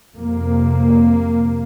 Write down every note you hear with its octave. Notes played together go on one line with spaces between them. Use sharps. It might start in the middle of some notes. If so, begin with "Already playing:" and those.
F2 C3 A#3